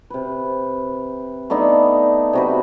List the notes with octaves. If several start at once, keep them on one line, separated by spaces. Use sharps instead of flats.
C3 B4
A3 B3 D4 D#4
C3 F#4 B4